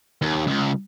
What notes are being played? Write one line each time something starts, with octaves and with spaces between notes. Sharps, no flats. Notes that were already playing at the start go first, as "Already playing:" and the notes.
D#2
C#2